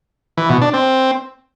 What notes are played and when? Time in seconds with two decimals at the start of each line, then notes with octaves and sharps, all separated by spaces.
0.37 E3
0.49 B2
0.61 D4
0.73 C4